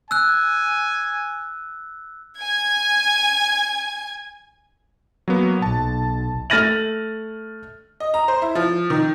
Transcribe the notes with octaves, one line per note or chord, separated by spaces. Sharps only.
G#5 E6 F#6
G#5 G#6
F#3 A#3 B3
B1 A5
A3 F6 A6 A#6 D#7 F#7
D#5
A#5
C5
E4
F3
D#3